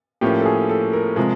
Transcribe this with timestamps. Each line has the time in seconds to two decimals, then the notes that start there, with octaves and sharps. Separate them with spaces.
0.21 A2 F3 A#3 C#4 G4
0.40 A4
0.45 G#4
0.69 A4
0.93 A#4
1.16 C3 F3 G#3